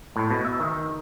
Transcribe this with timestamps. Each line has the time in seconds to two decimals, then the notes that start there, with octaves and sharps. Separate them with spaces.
0.16 A2
0.31 B2
0.45 E5
0.60 D#3